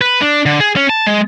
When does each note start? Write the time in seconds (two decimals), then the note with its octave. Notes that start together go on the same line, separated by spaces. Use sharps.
0.01 B4
0.21 D4
0.46 D3
0.60 G#4
0.76 C#4
0.90 A5
1.07 G#3